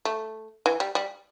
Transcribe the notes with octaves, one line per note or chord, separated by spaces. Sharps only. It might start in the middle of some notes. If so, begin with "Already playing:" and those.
A3
E3
G3
G3